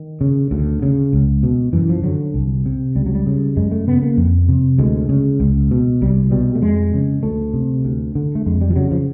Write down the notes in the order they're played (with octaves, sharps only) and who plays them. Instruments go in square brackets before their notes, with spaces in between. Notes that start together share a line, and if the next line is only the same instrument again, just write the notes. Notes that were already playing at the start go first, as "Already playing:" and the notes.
Already playing: [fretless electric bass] D#3
C#3
D2
C#3
C#2
B2
F#2 E3
F3
D3 F#3
C2
C3
C#2 G3
F#3
G3
C#3
F#2 G#3
A3
C#3 B3
A#3
F2
C3
D2 G#3
C#3
C#2
B2
C2 G3
B2 G3
A3
F2 G#3
C#3
D2 A3
C3
D2
D3
A3
F2 G#3
G3
F3
C#3 F#3
F3